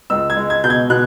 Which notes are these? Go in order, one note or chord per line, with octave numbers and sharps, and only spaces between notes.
C#2 E6
G#6
G#3
G#6
B2 G6
G#6
B2 F#6